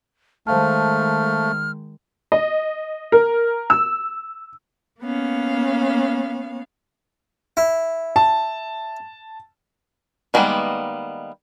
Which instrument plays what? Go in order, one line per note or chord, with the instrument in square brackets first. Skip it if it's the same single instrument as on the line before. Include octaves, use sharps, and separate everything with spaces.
[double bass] D#3 G#3 [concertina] A3 [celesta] C5 F5 A5 [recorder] F6
[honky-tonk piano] D#5
A#4
E6
[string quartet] A#3 B3 C#4 F5
[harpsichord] E4
[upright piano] A5
[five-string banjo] D#3 G3 G#3 A#3 B3